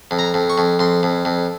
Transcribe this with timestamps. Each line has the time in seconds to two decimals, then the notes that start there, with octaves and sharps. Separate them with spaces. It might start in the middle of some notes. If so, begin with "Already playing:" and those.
0.11 F2
0.19 A#5
0.34 F2
0.50 C#6
0.58 F2
0.79 F2 C6
1.03 F2
1.25 F2